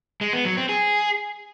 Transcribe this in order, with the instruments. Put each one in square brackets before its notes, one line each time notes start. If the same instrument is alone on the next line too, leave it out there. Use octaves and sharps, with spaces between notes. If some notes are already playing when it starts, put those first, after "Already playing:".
[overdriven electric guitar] G#3
B3
F#3
C4
G#4